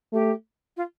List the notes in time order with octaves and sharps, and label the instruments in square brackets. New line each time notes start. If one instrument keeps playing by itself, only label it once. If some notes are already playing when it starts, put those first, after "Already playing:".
[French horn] A3 [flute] G4
[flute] F4